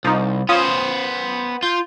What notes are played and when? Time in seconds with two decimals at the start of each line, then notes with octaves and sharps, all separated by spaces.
0.05 C2 F3 D#4
0.49 B3 C#4 F4 C5 D#6
1.63 F4 G6